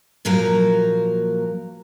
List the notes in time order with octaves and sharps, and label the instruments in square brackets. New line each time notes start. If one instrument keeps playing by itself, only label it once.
[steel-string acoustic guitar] A#2 F3 F#3 A#3 A#4